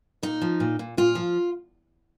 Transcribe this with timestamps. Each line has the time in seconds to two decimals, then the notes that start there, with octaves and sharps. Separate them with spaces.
0.23 A#2 D#4
0.42 F3
0.60 A#2
0.79 A#2
0.97 A#2 F4
1.15 F3